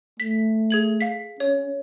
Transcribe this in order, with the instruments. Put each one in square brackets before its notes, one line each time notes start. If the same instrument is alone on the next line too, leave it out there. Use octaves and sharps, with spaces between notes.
[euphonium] A3 [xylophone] B6
[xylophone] G#4 G#6 F#7
F5 B6
[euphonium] C#4 [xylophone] C#5